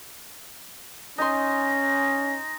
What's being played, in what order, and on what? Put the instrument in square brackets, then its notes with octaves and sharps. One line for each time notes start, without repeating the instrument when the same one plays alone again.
[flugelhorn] C#4 [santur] D#4 G#5 C6 [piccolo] A#6